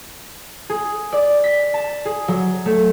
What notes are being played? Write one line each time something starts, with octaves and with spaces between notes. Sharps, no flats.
G#4
D5
B6
A5
G#4
F#3
A3